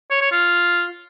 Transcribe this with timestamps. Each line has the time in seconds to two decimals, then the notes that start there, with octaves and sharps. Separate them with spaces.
0.11 C#5
0.21 C#5
0.32 F4